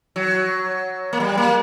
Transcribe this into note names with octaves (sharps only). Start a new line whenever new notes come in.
F#3
A#3
G3
A#3